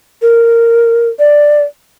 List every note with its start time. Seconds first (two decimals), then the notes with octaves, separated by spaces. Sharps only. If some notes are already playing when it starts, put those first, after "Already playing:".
0.22 A#4
1.19 D5